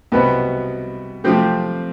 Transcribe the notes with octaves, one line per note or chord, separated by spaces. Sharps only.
C2 B2 B3
C3 F3 A3 C4 G4